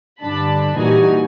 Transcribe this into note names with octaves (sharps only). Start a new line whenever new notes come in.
G2 D3 D4 A5 B5
A#2 E3 G3 D#4 F#4 G#5